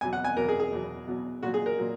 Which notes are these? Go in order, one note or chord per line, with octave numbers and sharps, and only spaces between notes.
E2 B2 F#3 G#5
F#5
G#5
E2 B2 F#3 A#4
G#4
G#4
E2 B2 F#3
E2 B2 F#3
A#2 F#3 F#4
G#4
A#4
A#2 F#3